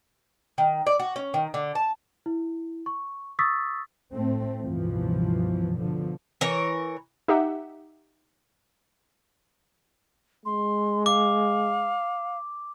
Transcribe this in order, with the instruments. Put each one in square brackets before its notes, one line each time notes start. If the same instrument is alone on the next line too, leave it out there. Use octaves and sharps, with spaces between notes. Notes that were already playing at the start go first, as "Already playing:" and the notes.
[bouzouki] D#3
D5
F#4
C#4
D#3
D3
A5
[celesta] E4
C#6
C#6 D#6 E6 A6 B6
[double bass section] A2 A3 C4
C#2 G2 B2 E3 F3
B2 D3 F3
[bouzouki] E3 A#4 C#5
[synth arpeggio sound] D#4 G4 E5 F#5
[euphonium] G#3 [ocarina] C6
[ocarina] F5 [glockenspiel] D6